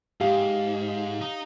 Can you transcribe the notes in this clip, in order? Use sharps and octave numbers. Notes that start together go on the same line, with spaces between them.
G#2 G4 F5
D#4